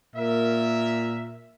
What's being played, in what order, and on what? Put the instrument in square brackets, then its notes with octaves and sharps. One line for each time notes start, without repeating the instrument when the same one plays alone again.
[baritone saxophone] A#2 [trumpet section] A#4 E5